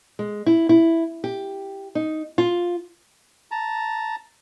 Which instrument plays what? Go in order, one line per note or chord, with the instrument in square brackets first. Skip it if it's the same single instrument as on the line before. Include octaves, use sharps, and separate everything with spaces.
[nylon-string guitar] G#3
E4
E4
G4
D#4
F4
[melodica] A5 A#5